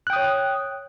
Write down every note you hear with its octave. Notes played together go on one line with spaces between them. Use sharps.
C#5 G5 D#6 F#6